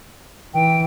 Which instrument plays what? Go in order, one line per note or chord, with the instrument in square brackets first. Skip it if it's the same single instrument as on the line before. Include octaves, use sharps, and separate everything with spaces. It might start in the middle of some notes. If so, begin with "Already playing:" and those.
[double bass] E3 [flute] G5